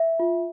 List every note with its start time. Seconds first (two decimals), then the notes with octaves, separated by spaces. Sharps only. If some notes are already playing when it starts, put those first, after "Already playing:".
Already playing: E5
0.20 F4